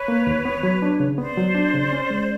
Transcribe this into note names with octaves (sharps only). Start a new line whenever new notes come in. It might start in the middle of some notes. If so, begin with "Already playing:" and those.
Already playing: B4 C#5
A#3
D#2
B3
F#3
D4
C#3
B3 C5 D5
F#3
D4
C#3
C#4
G#3